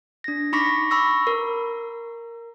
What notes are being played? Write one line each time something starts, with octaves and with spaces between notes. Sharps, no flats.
D4 A#6
D#4 B5 C#6 D6 A#6 B6
B5 C#6 E6 A#6
A#4